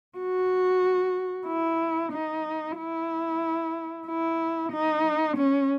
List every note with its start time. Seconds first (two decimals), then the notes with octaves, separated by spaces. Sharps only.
0.18 F#4
1.47 E4
2.12 D#4
2.77 E4
4.07 E4
4.72 D#4
5.37 C#4